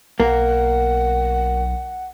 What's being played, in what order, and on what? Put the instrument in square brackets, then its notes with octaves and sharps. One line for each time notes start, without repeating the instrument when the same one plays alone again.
[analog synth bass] B1 [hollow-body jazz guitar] A#3 [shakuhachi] F#5